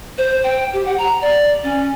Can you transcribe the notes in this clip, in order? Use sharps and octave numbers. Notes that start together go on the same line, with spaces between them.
C5
G5
G4
F#5
A#5
D5
C#4